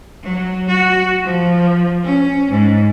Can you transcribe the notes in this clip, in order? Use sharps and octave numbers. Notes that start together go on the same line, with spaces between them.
F#3
F#4
F3
C#4
G#2